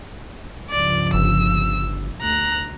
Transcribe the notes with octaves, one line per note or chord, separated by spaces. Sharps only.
C#2 G2 F3 D5
G1 E6
D2 A#5 F#6